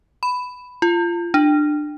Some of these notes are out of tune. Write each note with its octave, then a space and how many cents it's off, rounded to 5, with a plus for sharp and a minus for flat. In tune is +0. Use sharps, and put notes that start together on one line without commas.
B5 +10
F4 -25
D4 +25